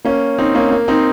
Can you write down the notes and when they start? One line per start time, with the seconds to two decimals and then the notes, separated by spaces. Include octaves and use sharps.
0.05 A#3 C#4
0.38 C4 D#4
0.55 A#3 C#4
0.71 A#3
0.88 C4 D#4